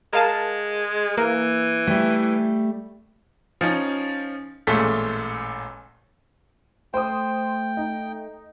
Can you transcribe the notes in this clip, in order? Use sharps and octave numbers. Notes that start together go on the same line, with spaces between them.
G#3 A#4 F5 A5
E3 A#3
G3 A3
F3 C#4 D#4
A1 A#2 G#3 A3 A4 B6
A3 C5 G5 D#6
D#4